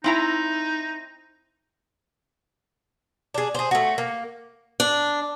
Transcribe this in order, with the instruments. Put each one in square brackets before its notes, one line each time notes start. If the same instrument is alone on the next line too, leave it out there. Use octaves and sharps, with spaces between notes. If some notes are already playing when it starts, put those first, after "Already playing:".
[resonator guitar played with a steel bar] C4 E4 A#5 [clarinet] D#4
[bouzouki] D4 G#4
G#4 C5
A3 F#4
A#3
[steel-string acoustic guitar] D4